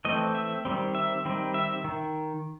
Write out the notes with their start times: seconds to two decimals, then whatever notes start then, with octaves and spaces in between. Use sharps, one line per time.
0.05 E3 A3 C4 D#5
0.35 E5
0.65 D#3 G3 C4
0.95 E5
1.25 D#3 G3 C4
1.54 E5
1.84 D#3